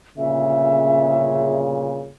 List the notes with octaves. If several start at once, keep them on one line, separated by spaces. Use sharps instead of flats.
G1 A#2 C#3 E5